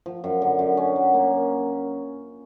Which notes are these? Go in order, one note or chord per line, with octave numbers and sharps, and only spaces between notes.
F3
F#2
D3
F#2
C#4
F#3
A#3